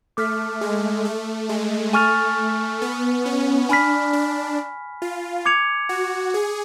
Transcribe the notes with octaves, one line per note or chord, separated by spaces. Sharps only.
A3 D6 F6 B6
G#3
A3
G#3
A3 G#5 C#6 F6 A6 F7
B3
C#4
D4 G#5 B5 F6 B6
D4
F4
D6 G#6 C#7 F7
F#4
G#4